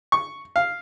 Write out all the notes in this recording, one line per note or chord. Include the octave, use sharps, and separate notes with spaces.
C#6
F5